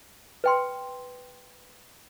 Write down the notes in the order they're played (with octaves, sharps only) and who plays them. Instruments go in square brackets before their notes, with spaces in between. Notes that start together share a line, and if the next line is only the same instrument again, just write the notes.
[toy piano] B4 G5 C6